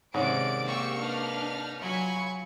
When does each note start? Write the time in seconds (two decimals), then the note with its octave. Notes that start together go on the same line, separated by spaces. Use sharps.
0.14 G#2 C3 D#3 C#4 D5 D7
0.65 A#3 G4 C#6 E6
0.99 D4 D#4 B4 F6
1.80 F#3 F4 G#5 B5 C#6